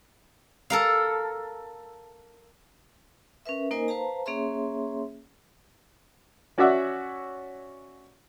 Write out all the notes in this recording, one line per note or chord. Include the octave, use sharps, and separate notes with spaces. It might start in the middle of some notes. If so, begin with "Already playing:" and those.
A4 A#4 F5
C#4 A#4 B4 E5
A#3 D#4 A#4 C5 D#5 G#5
B4 C5 F5 A5 A#5
A#3 C#4 G#4 C#5 E5 C6
C#4 F#4 C#5 D5 E5 F#5